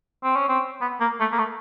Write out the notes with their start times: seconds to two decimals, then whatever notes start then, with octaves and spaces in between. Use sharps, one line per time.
0.24 C4
0.36 C#4
0.48 C4
0.81 B3
1.00 A#3
1.20 A3
1.32 A#3
1.39 A3